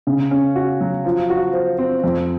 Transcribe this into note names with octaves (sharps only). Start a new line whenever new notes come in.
C#3
C#4
F#4
F#3
F3
F#4
C5
C4
F2